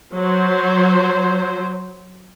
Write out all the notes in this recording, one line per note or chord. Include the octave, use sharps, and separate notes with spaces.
F#3 C5